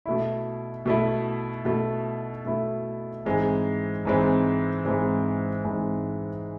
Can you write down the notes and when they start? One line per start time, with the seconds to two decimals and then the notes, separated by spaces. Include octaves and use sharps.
0.06 B2 A3 E4
0.86 B2 A3 E4
1.65 B2 A3 E4
2.45 B2 A3 E4
3.25 G#2 E3 G#3 C4
4.05 G#2 E3 G#3 C4
4.85 G#2 E3 G#3 C4
5.65 G#2 E3 G#3 C4